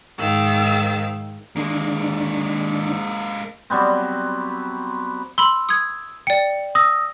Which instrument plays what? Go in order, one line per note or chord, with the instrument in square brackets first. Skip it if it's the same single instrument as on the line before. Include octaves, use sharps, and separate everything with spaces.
[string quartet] G#2 D#3 F5 E6
[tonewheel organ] D#3 D4 [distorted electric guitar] G#3 A#3
[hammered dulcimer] F#3 G3 B3 C4
[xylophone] B5 C6 [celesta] E6
[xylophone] D#6 G#6
[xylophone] D5 G5 [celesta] C#7
[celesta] D#6 E6 A#6